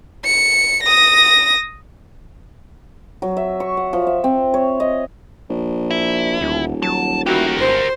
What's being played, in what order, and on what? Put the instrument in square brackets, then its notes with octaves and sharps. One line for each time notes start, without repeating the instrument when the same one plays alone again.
[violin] C#7
D#6 A#6
[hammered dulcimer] F#3
E5
C#6
F#5
F3
E5
C4
C#5
D#5
[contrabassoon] A#1
[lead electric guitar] E4
[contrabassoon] D#1 [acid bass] D2
[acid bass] F#3 [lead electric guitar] A5
[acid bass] E4 [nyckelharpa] F#4 [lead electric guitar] G4 A#4
[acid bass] G#1 [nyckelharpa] C5